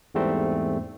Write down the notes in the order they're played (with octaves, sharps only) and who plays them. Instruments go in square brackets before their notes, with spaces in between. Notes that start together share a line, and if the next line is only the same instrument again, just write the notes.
[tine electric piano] E2 G#2 G3 A3 C4